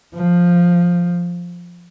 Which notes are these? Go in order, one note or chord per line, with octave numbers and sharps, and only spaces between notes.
F3